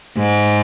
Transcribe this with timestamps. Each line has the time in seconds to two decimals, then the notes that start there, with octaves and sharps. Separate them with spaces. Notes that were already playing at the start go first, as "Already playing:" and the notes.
0.18 G#2